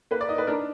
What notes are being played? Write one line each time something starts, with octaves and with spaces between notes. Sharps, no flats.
A#3 B4
D5
D#4 D#5
B4
D4 A#4